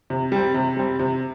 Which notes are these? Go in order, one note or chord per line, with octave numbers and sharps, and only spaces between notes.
C3
G3 C4
C3
G3 C4
C3